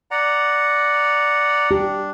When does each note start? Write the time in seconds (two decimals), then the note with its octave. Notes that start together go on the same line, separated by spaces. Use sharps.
0.11 D5 F#5 A#5
1.71 D4 G4